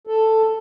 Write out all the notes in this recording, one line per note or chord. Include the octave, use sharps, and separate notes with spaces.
A4